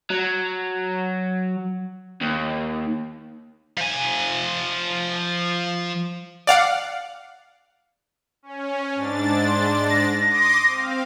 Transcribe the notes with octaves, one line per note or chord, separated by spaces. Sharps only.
F#3
D#2
F3 G#5
D5 F5 F#5
C#4
G#2 D4 A6
C6
A#6
C6 D6 D#6
C4 F5